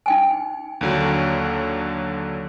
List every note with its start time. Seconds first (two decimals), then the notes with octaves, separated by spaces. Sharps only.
0.06 D#4 G5 G#5
0.81 D#2 D3 F#3